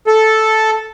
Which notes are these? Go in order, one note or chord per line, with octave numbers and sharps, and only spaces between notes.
A4